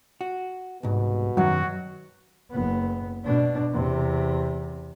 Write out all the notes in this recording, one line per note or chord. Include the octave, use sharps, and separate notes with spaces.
F#4
C2 G#2 B2
F#2 D#3 F#3 F#4
F#1 B3
B2 D4
E2 C3